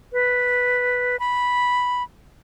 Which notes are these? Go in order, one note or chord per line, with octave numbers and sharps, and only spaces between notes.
B4
B5